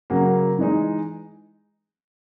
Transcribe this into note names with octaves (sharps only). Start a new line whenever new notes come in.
C#3 F#3 A#3
E3 G#3 D#4